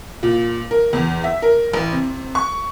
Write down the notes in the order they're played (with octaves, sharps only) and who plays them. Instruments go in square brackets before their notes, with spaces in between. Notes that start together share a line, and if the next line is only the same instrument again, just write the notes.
[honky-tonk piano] A#2
A#4
E2
E5
A#4
A1
C3
C#6